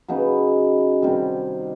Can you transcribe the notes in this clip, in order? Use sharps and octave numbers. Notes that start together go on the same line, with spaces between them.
C#3 F#3 B3 D#4
C3 D#3 G3